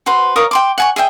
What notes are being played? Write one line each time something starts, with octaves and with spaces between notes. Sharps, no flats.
F#4 B4 C5 C6
A#4 C#5 F5 D#6
G5 C6 D6
F#5 G#5 C#6
G#4 D#5 E5 G5